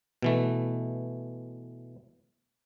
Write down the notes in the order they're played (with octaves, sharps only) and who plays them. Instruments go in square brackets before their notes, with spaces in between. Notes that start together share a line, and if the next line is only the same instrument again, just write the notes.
[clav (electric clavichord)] B2 E3 A3